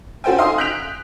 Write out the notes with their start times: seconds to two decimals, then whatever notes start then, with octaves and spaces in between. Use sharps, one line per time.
0.24 C#4 F#4 A4 C5 G5 G#5
0.38 D#4 F5 G#5 C6 D#6
0.58 F#6 G6 B6 D7 F7